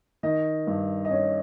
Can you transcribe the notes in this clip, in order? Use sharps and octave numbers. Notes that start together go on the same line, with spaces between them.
D#3 D#5
G2
D#5
C#4 C#5